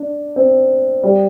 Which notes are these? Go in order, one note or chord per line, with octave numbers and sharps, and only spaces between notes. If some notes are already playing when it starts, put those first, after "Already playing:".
Already playing: D4
C4
G3